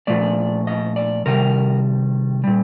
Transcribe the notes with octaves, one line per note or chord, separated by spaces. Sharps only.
A#2 F3 A3 D5
D#5
D5
C3 D#3 G3 A#4
A#2 G3